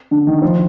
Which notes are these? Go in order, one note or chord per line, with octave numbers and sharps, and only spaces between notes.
D3
D#3
F3